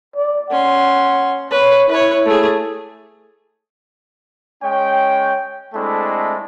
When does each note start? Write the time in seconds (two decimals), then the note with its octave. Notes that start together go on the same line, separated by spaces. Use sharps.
0.16 D5
0.50 C#4 F#5 C6
1.51 B4 C#5
1.89 E4 B4 C#5
2.25 A3 G#4
4.62 G#3 C#4 C#5 G5
5.74 G#3 A3 C4 D4 E4 A4